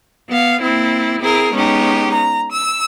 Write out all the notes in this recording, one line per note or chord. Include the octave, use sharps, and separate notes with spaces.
B3 F5
A#3 C4 E4
C4 E4 G#4 A#4
G#3 B3 C#4 D#4 G4
A#5
E6